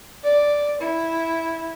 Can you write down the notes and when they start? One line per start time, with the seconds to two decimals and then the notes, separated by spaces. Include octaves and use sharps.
0.24 D5
0.81 E4